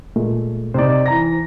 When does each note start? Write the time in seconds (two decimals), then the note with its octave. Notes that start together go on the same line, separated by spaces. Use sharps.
0.16 A#2 G#3 A3
0.74 C3 D#4 C5 D5
1.06 E3 A#5 A#6